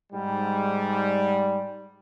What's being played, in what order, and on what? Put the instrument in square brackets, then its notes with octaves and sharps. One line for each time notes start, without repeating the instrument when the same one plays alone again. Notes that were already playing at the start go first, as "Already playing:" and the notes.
[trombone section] G#2 G3